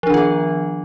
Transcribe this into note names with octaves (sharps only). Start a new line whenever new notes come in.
D#3 F3 B3 D4 F4